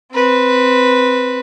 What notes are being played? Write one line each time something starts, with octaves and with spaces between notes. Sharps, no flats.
C4 B4